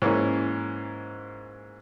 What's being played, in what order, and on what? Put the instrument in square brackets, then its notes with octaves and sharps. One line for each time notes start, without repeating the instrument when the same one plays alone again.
[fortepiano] G#2 E3 A#3 C#4